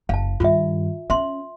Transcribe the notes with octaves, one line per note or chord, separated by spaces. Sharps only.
F#1 F5 A5
G2 D#3 F4 E5
C#4 E5 C6